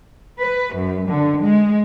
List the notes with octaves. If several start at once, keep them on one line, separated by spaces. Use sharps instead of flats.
B4
F#2
D3
G#3